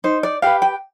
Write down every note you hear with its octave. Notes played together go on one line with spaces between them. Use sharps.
D#4 C5
D5
G4 B4 F5
G5